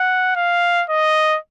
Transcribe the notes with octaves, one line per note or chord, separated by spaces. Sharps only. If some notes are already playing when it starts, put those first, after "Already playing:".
Already playing: F#5
F5
D#5